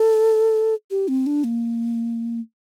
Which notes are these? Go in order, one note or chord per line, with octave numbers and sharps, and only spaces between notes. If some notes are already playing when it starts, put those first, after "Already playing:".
Already playing: A4
G4
C4
D4
A#3